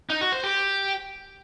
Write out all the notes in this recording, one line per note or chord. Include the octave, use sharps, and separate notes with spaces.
D#4
F#4
C5
G4